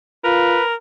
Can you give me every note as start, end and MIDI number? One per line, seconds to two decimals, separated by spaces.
0.24 0.59 65
0.24 0.74 70
0.24 0.64 71